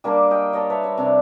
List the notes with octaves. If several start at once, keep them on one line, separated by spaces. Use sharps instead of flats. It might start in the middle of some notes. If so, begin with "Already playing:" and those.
G3 A#3 D4
D#5 G5
C#5 D#5 A5
B4 C#5 E5 A5
C#5
C3 D4